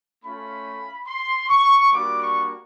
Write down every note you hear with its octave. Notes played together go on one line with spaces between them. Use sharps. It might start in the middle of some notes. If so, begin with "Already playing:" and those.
A3 C#4 F4 B5
C6
C#6
G3 A#3 D4 F#4 D6
C#6